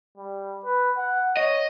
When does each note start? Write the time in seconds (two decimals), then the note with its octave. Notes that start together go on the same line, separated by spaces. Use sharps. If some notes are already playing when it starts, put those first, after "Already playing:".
0.17 G3
0.65 B4
0.97 F#5
1.37 C#5 D#5